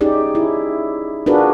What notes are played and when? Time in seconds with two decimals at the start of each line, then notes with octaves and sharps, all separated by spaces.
0.01 C#4 D#4 G4 G#4 D5
0.35 E4
1.26 D4 F4 F#4 G#4 A#4 B4